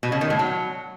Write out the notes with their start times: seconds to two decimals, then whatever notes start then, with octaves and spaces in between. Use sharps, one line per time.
0.03 B2
0.12 C#3
0.21 D#3
0.30 A2
0.39 F#3